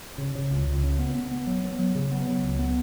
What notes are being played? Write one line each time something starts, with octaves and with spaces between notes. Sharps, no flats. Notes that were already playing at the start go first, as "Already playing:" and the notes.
C#3
C#3
C#2
C#2
C#3
B3
B3
B3
F#3
B3
F#3
C#3
B3
F#3
C#2
B3